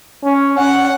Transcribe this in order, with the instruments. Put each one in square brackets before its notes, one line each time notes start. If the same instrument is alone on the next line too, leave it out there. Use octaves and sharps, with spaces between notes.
[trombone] C#4
[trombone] C#4 [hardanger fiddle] F#5